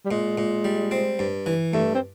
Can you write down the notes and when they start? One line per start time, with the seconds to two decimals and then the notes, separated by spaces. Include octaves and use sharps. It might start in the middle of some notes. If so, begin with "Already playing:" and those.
0.05 G3
0.11 A#2 G#3
0.38 A#2
0.65 G3
0.91 C4
1.19 G2
1.46 E3
1.73 G2 A3
1.94 C4